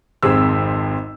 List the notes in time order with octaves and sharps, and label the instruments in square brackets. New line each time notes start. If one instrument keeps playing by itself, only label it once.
[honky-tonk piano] G#1 F2 C4 G#4 E6